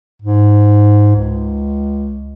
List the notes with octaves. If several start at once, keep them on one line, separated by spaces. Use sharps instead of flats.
G#2
C#2